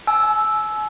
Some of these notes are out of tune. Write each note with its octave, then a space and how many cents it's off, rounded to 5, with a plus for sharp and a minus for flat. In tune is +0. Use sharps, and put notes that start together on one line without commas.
G#5 +40 E6 +0